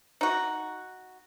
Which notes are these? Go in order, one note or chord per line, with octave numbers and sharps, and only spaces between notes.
D#4 F#4